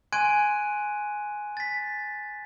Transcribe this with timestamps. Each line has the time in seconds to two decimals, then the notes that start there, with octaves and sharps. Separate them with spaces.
0.13 G#5 C6 F#6 G#6 D7 D#7
1.57 A6 B6